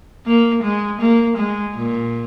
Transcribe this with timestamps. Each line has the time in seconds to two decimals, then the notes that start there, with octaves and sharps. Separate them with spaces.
0.26 A#3
0.63 G#3
1.01 A#3
1.37 G#3
1.75 A#2